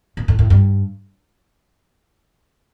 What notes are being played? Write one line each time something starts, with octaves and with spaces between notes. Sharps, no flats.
A#2
A2
A2
G2